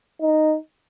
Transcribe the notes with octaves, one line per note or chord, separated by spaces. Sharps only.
D#4